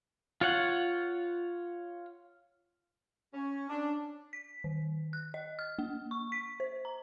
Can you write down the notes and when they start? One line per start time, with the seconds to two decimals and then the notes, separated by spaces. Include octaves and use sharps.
0.41 F4 C#5 F#5
3.34 C#4
3.69 D4
4.33 B6
4.64 D#3
5.13 F#6
5.34 D#5
5.59 F6
5.79 A#3
6.11 C#6
6.32 B6
6.60 C5
6.85 A#5